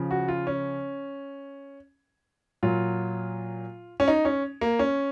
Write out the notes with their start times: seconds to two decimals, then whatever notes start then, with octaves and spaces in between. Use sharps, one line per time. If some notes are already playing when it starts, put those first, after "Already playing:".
Already playing: C#3 F3
0.11 F#4
0.28 F4
0.47 C#4
2.63 A#2 F#3 F4
4.00 C#4
4.08 D#4
4.25 C#4
4.61 A#3
4.79 C#4